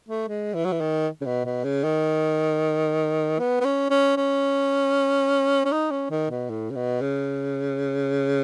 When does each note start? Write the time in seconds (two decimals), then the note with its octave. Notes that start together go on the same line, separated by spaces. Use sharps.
0.09 A3
0.28 G#3
0.54 E3
0.65 F#3
0.72 E3
0.80 D#3
1.21 C#3
1.26 B2
1.45 B2
1.64 C#3
1.84 D#3
3.39 B3
3.61 B3
3.65 C#4
3.90 C#4
4.17 C#4
5.65 C#4
5.72 D#4
5.91 C#4
6.10 D#3
6.30 B2
6.49 A2
6.70 C#3
6.75 B2
7.01 C#3